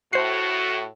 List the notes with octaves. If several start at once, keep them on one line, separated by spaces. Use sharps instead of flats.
A2 F#4 C5 C7